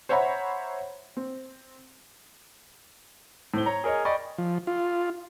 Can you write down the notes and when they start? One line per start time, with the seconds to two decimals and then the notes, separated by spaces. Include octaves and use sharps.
0.09 C5 C#5 E5 F#5 A#5 B5
1.17 C4
3.54 A2 C4 G7
3.66 C#5 A#5
3.84 G#4 A#4 C#5 D#5
4.05 D5 D#5 G5 B5 C#6
4.38 F3
4.67 F4